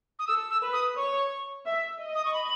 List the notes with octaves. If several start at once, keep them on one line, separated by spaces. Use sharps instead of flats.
D#6
A4 E6
E6
B4
D#6
C#5 C#6
E5
D#5
D#6
C#6
B5